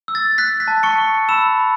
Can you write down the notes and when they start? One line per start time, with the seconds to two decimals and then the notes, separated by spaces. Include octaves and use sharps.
0.08 E6
0.15 A6
0.38 F#6 B6
0.60 B6
0.68 A5
0.83 C#6 C#7
0.98 C#6
1.29 B5 E6 E7
1.59 B5